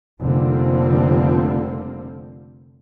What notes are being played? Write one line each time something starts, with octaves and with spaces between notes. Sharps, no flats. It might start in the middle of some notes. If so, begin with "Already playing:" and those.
F1 D3 F3 G3 A#3 C4